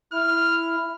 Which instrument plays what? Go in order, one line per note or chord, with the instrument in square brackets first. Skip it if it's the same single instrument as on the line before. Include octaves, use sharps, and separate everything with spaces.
[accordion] E4 [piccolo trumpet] F6